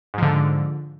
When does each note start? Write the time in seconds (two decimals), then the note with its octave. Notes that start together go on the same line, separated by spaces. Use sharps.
0.14 G#2
0.18 F3
0.22 D3